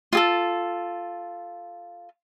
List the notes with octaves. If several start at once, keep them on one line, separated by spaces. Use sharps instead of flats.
F4 G#4 A4